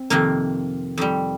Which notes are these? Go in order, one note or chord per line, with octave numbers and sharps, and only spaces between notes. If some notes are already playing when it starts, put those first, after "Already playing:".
Already playing: C4
F2 C3 D#3 A#3
F2 D#3 G3